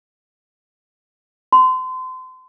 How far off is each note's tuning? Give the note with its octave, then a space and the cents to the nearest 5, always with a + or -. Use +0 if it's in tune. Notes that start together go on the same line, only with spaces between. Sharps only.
C6 -30